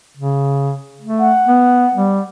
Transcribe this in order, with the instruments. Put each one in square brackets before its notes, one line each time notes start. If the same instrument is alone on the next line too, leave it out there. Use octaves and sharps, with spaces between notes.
[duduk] C#3
A3
[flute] F#5
[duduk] B3
G3